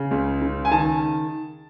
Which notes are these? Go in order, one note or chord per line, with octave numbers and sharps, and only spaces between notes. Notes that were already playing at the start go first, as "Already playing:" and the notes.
Already playing: C#3
C#2
C#3
G#5
D#3 A5